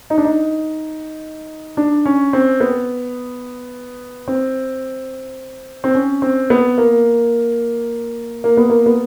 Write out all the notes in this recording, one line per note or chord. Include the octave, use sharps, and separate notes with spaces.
D#4
D4
D#4
D4
C#4
C4
B3
C4
C4
C#4
C4
B3
A#3
A#3
B3
A#3
B3